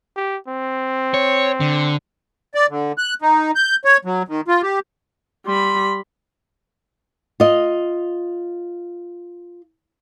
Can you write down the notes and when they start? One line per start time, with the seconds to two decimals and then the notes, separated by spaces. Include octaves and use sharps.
0.16 G4
0.48 C4
1.14 C#5
1.60 D3
2.55 D5
2.69 D3
2.98 F#6
3.22 D#4
3.56 G6
3.85 C#5
4.05 F#3
4.28 D#3
4.48 F4
4.62 G4
5.46 G3 B5 C6
7.40 F4 D#5